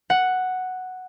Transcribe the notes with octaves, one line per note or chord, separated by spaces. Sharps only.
F#5